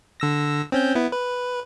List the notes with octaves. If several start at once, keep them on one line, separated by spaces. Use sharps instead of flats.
D3 E6 A#6
C4 C#4 G6
B3 E4
B4